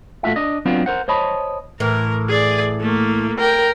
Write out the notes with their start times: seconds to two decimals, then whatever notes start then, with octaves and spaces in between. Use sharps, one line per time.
0.23 A#2 A3 C#4 F4 F#4 E5
0.36 D4 D#5
0.66 F#3 B3 C4 D4 F4
0.86 A#4 C5 F#5
1.08 C5 C#5 D#5 A5 B5
1.80 A2 E3 A#4
2.29 G#4 D5
2.80 A3 A#3
3.39 A#4 G5